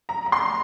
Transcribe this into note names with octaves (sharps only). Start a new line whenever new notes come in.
A#5
A#5
C6